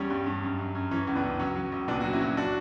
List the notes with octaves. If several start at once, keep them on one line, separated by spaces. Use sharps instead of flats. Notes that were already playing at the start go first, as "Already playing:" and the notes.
Already playing: E2 G3 C#4
G2
G2
F#2
F#2
F#2
E3 C#4
C#2
B3 D4
C#2
F#3 C#4
F#3
C#2
A#2 B3 D4
F#3 F#4
C#4 E4
F#3
D4 F#4